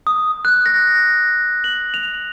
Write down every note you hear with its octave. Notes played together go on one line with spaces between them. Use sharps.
D#6
F#6
A#6
F#7
F7